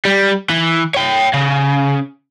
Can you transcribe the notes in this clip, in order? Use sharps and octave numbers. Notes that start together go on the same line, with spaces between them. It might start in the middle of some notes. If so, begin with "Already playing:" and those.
G3
E3
C#5 G5
C#3